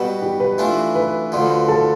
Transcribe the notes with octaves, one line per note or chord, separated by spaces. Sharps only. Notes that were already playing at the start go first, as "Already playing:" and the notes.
Already playing: B2 G3 B3 B4
G4
B4
E3 A3 D4 F4
B4
D2 D3 F3
A4